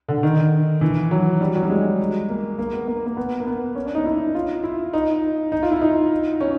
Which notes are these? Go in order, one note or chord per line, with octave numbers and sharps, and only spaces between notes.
D3
D#3
E3
F#3
G3
F#3
G3
G#3
A#3
A#3
B3
A#3
A#3
B3
A#3
B3
C#4
D4
D#4
E4
F4
E4
D#4
D#4
F4
E4
D#4
C#4